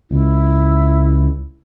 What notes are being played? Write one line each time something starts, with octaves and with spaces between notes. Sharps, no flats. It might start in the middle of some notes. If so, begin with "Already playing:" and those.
C#2 E4